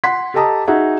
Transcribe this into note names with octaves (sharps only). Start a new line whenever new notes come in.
F#5 C6 B6
G4 A4 D#5 A5 A#5 D#6
D#4 F#4 G#4 E5 F#5